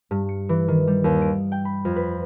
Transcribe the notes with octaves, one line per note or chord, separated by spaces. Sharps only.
G2
C#7
E3
D#3
G3
D#2
D7
G5
B5
F2
B4